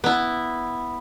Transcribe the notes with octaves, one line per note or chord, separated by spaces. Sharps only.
B3 E4